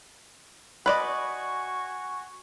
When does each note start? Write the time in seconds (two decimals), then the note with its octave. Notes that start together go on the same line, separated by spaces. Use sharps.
0.86 F#4 B4 D5 D#5 G#5 C#6